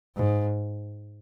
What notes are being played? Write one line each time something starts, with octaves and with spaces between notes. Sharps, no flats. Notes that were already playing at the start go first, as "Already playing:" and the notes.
G#2